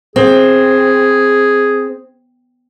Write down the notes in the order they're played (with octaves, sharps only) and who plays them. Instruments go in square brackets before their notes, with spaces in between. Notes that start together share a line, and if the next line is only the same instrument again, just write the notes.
[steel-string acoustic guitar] C4 [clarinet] G#4